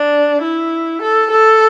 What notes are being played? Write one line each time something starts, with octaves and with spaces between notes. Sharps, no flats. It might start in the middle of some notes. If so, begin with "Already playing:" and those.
Already playing: D4
E4
A4
A4